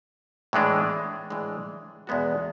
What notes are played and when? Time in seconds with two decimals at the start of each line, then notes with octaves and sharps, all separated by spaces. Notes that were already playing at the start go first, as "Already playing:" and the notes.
0.53 A2 E3 G#3 D4
1.30 A2 E3 G#3 D4
2.07 E2 B2 G#3 B3 F#4